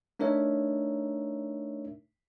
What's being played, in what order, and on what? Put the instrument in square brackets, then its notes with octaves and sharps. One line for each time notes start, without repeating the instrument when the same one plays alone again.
[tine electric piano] A3 D4 D#4 A#4 C#5 E5